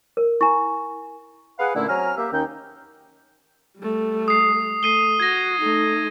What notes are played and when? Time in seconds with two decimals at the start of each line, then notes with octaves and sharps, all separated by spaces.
0.17 A#4
0.41 E4 G#5 A#5 C#6
1.59 G#4 B4 F5 F#5
1.75 A#2 D3 A3 C#4 E4
1.88 F#3 C4 G#5 A#5 F6
2.17 A#3 G4 E5
2.32 D#2 D#3 C#4 D#4 G5
3.78 G3 A3
4.28 D#6 C7
4.83 A3 C7 D#7 G7
5.20 F#4 G#6 A#6
5.61 A3 D#4